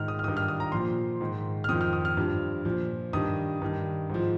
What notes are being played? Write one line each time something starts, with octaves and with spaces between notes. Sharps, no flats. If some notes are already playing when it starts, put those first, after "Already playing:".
Already playing: G#2 D#3 F6
D#6
F6
G2 D#3 D#6
F6
D#6
A#5
A#2 F3 C6
G#2 D#3
F6
F2 D#3 D#6
F6
D#6
F6
G2 F3
A#2 F3
G2 D#3 D#6
G2 D#3
G#2 F3